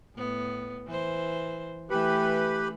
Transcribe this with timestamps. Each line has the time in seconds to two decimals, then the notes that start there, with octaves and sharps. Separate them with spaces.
0.16 A2 B3
0.87 E3 C5
1.90 E3 A3 G4 B4 B5